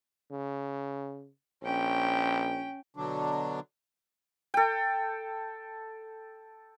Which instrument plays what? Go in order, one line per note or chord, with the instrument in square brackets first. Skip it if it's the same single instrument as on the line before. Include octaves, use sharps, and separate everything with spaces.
[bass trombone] C#3
[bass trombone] A#1 [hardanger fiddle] C#4 G5
[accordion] B2 D3 F#3 D4
[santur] A4 G5